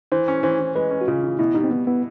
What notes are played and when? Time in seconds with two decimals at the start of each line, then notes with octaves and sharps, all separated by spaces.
0.12 E3 C5
0.28 C#4
0.43 E3 C5
0.59 E3
0.76 G#3 B4
0.91 C#4
1.01 F#4
1.08 C#3 F4
1.23 E3
1.39 B2 E4
1.55 G3 D#4
1.64 C4
1.71 G3 B3
1.87 B3 E4